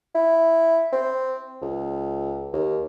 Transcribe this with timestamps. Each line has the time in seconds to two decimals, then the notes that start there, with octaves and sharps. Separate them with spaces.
0.15 E4
0.93 C4
1.62 C#2
2.53 D#2